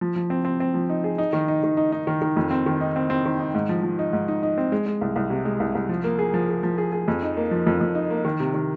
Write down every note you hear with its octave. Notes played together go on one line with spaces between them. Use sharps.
F3
F3
C4
C4
C4
F3
D#4
G#4
D#4
D#3
D#4
D#3
D#4
D#4
D#3
D#3
F2
C4
D#3
D#4
C4
C4
D#3
D#4
G#2
F3
F3
D#4
G#2
D#4
D#4
C4
G#3
G#3
C2
C2
C3
G#3
C2
C2
F3
A#3
G#4
F3
G#4
F3
G#4
G#4
F2
D#4
A#3
F3
F2
F2
D#4
A#3
D#3
C3
D#3